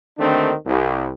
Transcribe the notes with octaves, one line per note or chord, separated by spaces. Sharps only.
D#2 D3 D#3 A3 C4 D4
C2